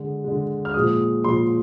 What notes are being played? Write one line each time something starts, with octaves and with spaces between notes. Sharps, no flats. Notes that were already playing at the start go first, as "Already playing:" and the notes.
Already playing: D3 G#3
D3 G#3
F6
A#2 F3 G#3 D#6
A#2 F3 G#3 C6